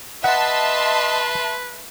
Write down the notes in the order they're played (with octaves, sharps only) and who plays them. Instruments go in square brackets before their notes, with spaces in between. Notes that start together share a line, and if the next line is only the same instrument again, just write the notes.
[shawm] B4 [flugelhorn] D#5 [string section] E5 A5 C6 [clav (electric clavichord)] F#5